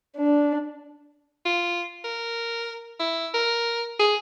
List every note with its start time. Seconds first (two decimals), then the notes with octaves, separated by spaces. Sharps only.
0.16 D4
1.45 F4
2.04 A#4
3.00 E4
3.34 A#4
3.99 G#4